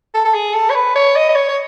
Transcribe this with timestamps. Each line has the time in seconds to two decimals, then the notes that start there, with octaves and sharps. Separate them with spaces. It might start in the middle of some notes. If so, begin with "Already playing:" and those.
0.14 A4
0.25 A4
0.34 G#4
0.55 A4
0.70 C#5
0.75 B4
0.96 C#5
1.16 D#5
1.29 D#5
1.36 C#5
1.49 C#5